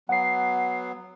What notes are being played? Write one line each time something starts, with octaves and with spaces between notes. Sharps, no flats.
F#3 B3 F#5 C7